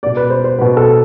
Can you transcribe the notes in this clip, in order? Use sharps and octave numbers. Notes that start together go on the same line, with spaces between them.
B2 B3 D5
B4
C5
C5
B2 B3 B4
A4